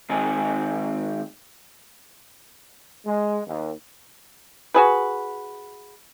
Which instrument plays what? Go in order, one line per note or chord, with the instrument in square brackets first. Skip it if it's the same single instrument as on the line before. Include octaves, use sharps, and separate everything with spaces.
[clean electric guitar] D#3 G#3 C4 D#4 G#5
[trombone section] G#3
D#2
[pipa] F#4 G#4 B4